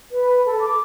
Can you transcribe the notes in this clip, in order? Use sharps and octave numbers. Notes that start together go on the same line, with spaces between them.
B4
A4
D6